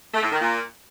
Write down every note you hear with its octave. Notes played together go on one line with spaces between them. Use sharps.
A3
A2
D#3
A#2